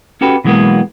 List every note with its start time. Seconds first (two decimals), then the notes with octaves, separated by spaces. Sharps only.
0.21 C#4 F#4 G4 A4 B4
0.44 B2 E3 F#3 G#3 A#3 B3